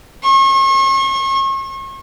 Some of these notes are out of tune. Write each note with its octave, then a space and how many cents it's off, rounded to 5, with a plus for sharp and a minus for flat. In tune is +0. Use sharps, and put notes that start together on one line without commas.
C#6 -40